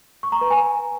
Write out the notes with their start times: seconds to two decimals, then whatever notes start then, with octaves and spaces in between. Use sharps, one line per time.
0.23 C#6
0.32 A#5
0.41 B4
0.50 G#5